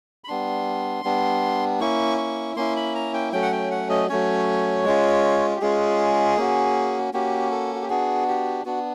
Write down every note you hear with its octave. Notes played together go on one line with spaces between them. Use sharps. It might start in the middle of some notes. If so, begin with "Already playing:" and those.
B5
G3 B3 D4 C6
G3 B3 D4
A#3 C#4 E4 C#6
C#6
A#3 C#4 E4 C6
B5
A#5
G5
F#3 A3 C#4 G5
F#5
G5
F#5
D#5
F#3 A3 C#4 C#5
G#3 C#4 F4
G4
G#3 C#4 F4 G#4
A#3 C#4 F#4
A#3 C#4 F#4 G4
A4
F#4
G4
B3 D4 F#4 G#4
G4
B3 D4 F#4